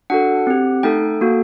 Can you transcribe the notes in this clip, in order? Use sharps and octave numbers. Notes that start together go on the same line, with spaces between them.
D4 F#4 A4 F#5
C4 G4
A3 D#4 A4 G5
A#3 F#4 A4